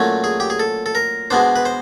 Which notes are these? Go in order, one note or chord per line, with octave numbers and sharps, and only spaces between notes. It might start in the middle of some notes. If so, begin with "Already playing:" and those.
Already playing: A#2 F#3 A3 C#4
G#4
G4
G#4
A4
A4
A#4
B2 G#3 B3 D4 C5
B4
C5